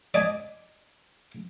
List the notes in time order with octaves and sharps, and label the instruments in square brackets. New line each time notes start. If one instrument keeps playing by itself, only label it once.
[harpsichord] D5 D#5 G#5